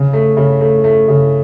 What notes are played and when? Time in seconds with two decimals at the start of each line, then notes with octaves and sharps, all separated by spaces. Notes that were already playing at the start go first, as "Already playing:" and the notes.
Already playing: C#3
0.13 A3
0.37 C#3
0.61 A3
0.84 A3
1.08 C#3